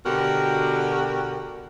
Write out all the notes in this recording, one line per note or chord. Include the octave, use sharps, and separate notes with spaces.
B2 D3 F#4 G4 A#4